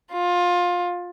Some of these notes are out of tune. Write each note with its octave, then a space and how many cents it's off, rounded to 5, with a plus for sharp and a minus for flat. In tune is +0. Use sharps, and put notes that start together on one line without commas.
F4 +20